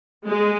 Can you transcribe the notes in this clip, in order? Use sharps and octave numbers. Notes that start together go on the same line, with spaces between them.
G#3